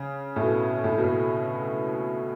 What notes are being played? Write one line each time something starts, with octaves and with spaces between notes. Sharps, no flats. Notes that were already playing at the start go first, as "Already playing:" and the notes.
Already playing: C#3
A2
B2
A2
B2
A2